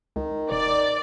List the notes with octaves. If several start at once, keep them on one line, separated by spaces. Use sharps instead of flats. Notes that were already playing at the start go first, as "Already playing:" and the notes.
C#2 D#3
E1 D5